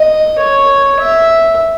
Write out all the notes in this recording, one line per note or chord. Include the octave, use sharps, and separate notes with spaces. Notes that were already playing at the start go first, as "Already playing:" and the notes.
Already playing: D#5
C#5
E5